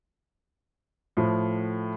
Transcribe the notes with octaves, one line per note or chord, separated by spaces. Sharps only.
A2 F3